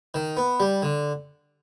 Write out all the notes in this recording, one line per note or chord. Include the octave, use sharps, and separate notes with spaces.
D#3
B3
G3
D3